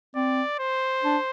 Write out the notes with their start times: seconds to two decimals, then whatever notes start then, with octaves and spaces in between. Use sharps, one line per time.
0.16 C4 D5
0.59 C5
1.04 D4